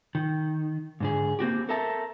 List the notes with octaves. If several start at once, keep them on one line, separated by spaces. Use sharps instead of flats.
D#3
G#2 D3 G#4
A#3 C4 F#4 G4
A4 A#4 E5 A5